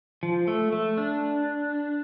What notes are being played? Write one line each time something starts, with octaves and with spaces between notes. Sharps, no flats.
F3
A3
A3
D4